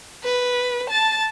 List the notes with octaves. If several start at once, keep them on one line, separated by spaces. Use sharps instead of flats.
B4
A5 A6